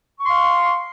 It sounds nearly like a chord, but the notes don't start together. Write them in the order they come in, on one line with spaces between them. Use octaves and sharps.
C#6 C6 F5